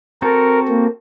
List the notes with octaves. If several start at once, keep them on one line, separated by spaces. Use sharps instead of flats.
C4 F#4 A4 A#4
A#3